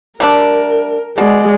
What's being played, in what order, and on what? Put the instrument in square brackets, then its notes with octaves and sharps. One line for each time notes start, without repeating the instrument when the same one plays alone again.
[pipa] G3 A3 D4 [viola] A#4
[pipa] B2 [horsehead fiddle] G#3 [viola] D5